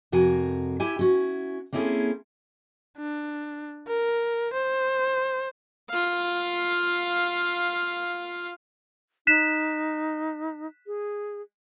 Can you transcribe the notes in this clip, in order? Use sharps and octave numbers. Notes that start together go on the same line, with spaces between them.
F2 C3 F#4 A#4 G#5
E4 G4 E5 G#5
C#4 E4 F#4
A#3 C4 C#4 E4 G#4 A4
D4
A#4
C5
F4 F5
D#4 F#6 B6 E7
G#4